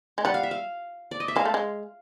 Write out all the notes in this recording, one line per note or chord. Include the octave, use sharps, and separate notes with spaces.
G#3
G3 F#5
F5
E5
F5
D5
D#5
E5
G#3 F5
A3
G#3